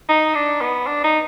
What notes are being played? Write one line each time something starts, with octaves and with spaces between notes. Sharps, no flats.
D#4
D4
B3
D4
D#4